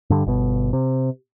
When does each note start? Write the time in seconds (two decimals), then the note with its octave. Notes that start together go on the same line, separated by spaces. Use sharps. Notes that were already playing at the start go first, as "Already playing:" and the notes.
0.10 G2 D3
0.26 G1 B2
0.73 C3